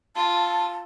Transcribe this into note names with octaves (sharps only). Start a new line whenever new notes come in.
F4 A5